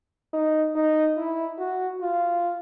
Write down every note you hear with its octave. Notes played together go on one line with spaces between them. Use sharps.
D#4
D#4
E4
F#4
F4